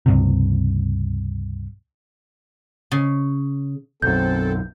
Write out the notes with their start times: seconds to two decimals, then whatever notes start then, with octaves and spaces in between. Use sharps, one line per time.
0.06 C#2 G2 C3
2.92 C#3
4.02 B1 F#2 C4 A4 G6